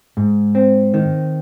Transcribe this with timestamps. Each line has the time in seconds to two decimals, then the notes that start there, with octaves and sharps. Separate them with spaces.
0.17 G#2
0.55 C4
0.94 D#3